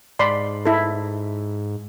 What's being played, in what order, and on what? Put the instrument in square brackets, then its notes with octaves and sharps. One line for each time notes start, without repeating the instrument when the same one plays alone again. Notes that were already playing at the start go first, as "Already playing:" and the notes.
[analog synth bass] G#2 [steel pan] D5 B5 C6
[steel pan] E4 A4